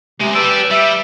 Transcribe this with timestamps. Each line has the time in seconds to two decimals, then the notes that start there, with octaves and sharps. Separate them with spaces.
0.20 B1 C3 G#3
0.35 G4 B4 D5 A5 E6
0.71 G3 E5